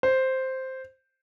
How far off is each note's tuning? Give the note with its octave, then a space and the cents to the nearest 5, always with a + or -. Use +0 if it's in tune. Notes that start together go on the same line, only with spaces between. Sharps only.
C5 +0